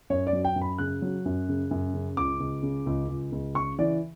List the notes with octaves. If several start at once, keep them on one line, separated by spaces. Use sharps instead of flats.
F#2 C#5
D5
F#3
G5
F#2
B5
C#3 F#6
F#3
F#2
C#3
F#2
C#3
C#2 D6
C#2
C#3
C#2
C#2
C#2
C#3 C#6
E3 D5